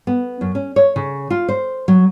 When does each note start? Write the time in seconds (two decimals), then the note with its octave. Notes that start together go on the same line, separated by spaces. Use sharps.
0.07 B3
0.41 F#2
0.55 C#4
0.76 C#5
0.96 C#3
1.30 F4
1.48 C5
1.88 F#3